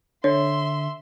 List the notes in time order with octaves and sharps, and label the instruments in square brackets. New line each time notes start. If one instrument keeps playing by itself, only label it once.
[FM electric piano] D3 [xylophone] C#5 [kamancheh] E5 C6